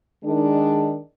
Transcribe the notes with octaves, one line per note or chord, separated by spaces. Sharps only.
D#3 G#3 D4